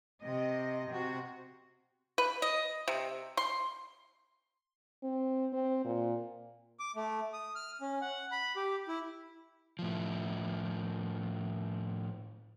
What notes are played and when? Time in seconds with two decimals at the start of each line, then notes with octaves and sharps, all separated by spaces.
0.21 C3 D#5
0.88 C3 F#4
2.18 B4
2.42 D#5
2.88 C3
3.37 C6
5.03 C4
5.53 C4
5.85 A#2
6.79 D6
6.96 A3
7.33 D#6
7.55 F6
7.81 C#4
8.01 F#5
8.31 B5
8.56 G4
8.88 E4
9.79 A2 F3